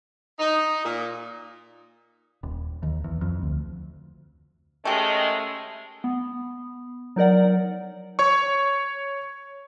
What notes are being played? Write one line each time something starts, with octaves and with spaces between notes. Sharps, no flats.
D#4
A#2
D#1
D#2
E2
F2
D2
D#3 G#3 A3 C#4 G4
B3
F#3 D#4 A#4 D5 F#5
C#5 C#6